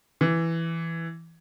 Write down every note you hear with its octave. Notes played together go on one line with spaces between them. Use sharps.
E3